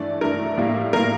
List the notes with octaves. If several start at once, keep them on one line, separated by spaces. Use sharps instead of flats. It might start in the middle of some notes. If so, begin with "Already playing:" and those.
Already playing: G2 E3 A3 D5
G2 E3 A3 A#4
A2 G3 A#3
A2 G3 A#3 A#4